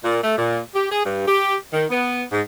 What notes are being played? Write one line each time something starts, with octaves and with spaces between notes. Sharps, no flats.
A#2
A3
A#2
G4
G#4
G2
G4
D#3
B3
G#2